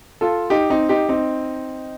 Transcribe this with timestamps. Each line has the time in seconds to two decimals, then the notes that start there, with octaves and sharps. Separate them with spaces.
0.21 F4 A4
0.50 D#4 G4
0.70 C4 D#4
0.89 D#4 G4
1.09 C4 D#4